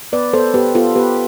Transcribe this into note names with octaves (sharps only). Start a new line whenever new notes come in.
B3 B4 D5
B3 A4 C5
B3 G4 B4
B3 F4 A4
B3 G4 B4